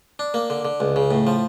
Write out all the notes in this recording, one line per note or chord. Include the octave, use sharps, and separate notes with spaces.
D4
A#3
D3
D3
C#2
C#3
A2
F3